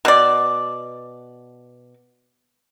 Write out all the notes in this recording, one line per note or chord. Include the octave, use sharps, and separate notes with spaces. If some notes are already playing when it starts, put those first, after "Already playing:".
B2 D5